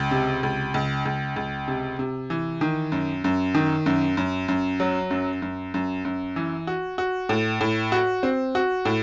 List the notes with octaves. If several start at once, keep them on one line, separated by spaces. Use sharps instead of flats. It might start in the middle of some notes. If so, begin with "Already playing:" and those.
Already playing: C#2
C3
C#2
C#2
C#2
C#2
C3
C3
E3
D#3
F#2
F#2
D#3
F#2
F#2
F#2
F#3
F#2
F#2
F#2
F#2
E3
F#4
F#4
A2
A2
F#4
C4
F#4
A2